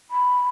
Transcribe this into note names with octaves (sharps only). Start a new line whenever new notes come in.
B5